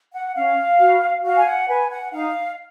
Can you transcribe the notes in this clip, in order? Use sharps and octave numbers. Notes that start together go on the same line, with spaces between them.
F#5
C#4 F5
F#4 B4
F#4 F5
G#5
F#5
B4 G#5
F#5
D#4 F5